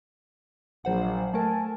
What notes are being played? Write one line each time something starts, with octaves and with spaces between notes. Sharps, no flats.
A#1 F#3 C5 F#5
A3 A4 A#4 G#5 A5